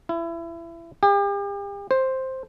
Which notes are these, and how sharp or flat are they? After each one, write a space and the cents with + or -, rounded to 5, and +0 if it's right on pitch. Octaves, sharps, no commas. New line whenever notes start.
E4 +25
G4 +40
C5 +5